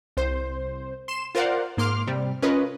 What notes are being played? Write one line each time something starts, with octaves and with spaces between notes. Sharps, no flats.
C2 C5
C6 E7
F4 A#4 C5 D5 F5 F#5
G#2 A#3 C6 D6 F6
C3 G3
C#4 F4 A#4 B4 D#5